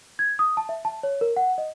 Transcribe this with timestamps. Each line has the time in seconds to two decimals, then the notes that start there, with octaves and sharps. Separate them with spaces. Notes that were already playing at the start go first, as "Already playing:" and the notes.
0.19 G#6
0.39 D#6
0.57 A5
0.69 E5
0.85 A5
1.03 C#5
1.21 A#4
1.37 F#5
1.58 D#5